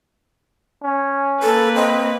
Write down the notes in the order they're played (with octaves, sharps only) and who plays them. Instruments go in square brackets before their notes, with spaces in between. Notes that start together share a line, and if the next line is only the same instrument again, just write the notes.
[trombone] C#4
[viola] A#3 B4 [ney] A4
[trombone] C4 [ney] D#5